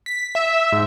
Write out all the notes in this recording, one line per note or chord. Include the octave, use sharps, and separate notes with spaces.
B6
E5
G#2